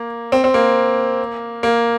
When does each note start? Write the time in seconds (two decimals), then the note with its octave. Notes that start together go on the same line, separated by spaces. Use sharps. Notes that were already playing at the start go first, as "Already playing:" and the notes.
Already playing: A#3
0.32 C4
0.44 C4
0.54 A#3
1.63 A#3